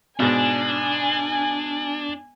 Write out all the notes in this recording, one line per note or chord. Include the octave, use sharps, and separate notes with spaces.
G#2 B2 D4 G#5